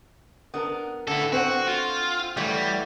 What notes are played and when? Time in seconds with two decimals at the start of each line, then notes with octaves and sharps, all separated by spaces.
0.54 B3 D4 A#4
1.07 D3 E4 A4
1.32 C4 F#4 C5 F#5
1.68 F4
2.37 E3 F#3 G3 A3